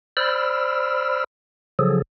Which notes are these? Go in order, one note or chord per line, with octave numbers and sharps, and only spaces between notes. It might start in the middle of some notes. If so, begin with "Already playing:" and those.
C5 D5 B5 E6 F6
C#3 F3 F#3 G#4 A4